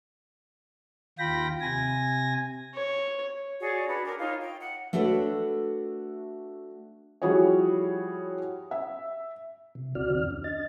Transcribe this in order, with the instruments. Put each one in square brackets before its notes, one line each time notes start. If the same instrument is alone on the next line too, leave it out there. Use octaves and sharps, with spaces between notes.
[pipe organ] D#2 F4 G5 B5 A#6
C3 G#5 A#6
[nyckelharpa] C#5
[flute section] F#4 G#4 C#5 D5
D4 F#4 G#4 B4
A#4 G5 G#5 D6
D#4 F4 C#5 F5
G5
F#5
[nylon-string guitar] A3 D4 F#4 A4 B4 C#5
[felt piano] F3 G3 E4 F#4 G#4 C#5
E5
[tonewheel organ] C3
D2 C#3 C4 F#4 D5 F6
F2 D#3 F6
D4
D#5 A6